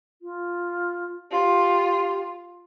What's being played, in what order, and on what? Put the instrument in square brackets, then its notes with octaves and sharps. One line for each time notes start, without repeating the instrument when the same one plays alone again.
[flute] F4
[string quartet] F4 [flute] G4